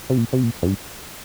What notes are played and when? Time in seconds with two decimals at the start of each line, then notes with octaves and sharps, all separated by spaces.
0.10 C3
0.17 A#2
0.33 C3
0.43 A#2
0.63 F2
0.67 G2